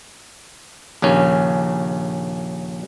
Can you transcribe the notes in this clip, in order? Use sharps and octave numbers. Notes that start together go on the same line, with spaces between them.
A#1 D#2 C#3 C#4